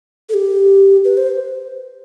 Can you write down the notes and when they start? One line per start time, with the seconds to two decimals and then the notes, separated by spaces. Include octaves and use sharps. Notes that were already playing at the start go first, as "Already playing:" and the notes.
0.29 A4
0.34 G4
1.04 B4
1.17 C5